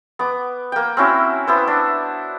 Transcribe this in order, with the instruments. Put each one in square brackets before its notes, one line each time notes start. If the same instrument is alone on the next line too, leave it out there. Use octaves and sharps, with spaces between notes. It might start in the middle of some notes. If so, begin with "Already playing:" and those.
[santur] B3 D6
A#3 G5
C4 C#4 E4 F#4
B3 E4 C5
D4